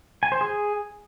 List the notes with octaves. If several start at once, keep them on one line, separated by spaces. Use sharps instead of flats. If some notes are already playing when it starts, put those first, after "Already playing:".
G#5
C5
G#4